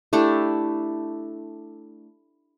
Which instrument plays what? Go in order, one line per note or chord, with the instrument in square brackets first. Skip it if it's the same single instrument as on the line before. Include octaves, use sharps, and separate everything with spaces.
[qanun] A3 D4 E4 G4